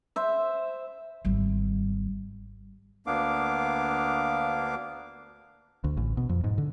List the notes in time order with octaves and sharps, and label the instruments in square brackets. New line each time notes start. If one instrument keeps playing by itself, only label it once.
[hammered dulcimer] C5 E5
[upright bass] G#1 G3
[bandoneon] D2 A#3 B3 D4 F5 D6
[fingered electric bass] D2
A1
B2
F2
G#2
D3